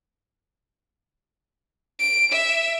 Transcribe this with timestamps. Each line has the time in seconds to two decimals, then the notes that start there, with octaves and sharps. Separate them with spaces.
1.99 D7
2.32 E5